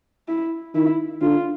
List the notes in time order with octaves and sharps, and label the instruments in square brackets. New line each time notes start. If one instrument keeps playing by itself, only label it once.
[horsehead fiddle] E4
[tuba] D#3 [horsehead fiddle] E4
[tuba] D3 [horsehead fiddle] F4